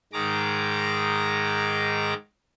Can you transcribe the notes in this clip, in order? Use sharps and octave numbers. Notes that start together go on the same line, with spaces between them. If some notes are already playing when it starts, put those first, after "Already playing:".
G#2 D#3 G#3 A#5 D6